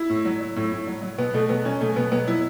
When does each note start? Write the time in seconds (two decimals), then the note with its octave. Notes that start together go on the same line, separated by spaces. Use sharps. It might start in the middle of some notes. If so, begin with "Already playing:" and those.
Already playing: E4
0.10 A2
0.25 F#3
0.40 F#3
0.56 A2
0.72 A2
0.87 F#3
1.02 F#3
1.18 B2 B3
1.34 B2 A3
1.49 F#3 B3
1.65 F#3 C#4
1.81 B2 A3
1.96 B2 B3
2.12 F#3 B3
2.28 F#3 E4